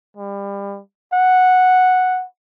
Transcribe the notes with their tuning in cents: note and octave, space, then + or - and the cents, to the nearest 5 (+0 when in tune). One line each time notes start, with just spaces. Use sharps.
G3 +30
F#5 -5